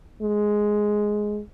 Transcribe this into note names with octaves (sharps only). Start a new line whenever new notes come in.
G#3